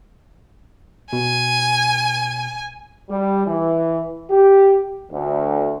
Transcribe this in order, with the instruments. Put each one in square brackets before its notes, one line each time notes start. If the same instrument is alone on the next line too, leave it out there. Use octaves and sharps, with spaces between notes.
[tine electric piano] B2 [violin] G#5
[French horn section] G3
E3
G4
D2